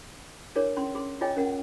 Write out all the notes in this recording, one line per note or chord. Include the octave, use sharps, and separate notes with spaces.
D4 G#4 A#4 C#5
C#4 C6
G#4 C6
F4 G#4 C#5 D#5 G5 G#5
C#4 A#4 F#5